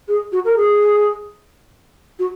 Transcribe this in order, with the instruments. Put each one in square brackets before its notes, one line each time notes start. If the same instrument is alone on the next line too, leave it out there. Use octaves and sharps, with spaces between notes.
[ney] G#4
F#4
A#4
G#4
F#4